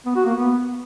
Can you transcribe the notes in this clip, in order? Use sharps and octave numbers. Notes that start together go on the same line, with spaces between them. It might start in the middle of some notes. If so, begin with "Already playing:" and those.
B3
F#4
A#3
B3